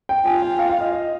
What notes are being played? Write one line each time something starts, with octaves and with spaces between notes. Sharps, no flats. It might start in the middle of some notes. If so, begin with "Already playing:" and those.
G5
F4 G#5
G5
F5
F5
D#5
D#5